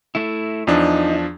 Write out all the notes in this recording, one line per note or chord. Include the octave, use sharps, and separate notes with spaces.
A3 E4
E2 F3 D4 D#4